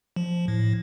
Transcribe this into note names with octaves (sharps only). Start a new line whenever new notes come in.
F3
A2